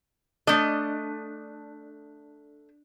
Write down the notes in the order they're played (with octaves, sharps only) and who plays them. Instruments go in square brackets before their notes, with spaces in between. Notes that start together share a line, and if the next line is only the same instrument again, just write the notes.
[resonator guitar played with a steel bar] A3 D#5 [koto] D4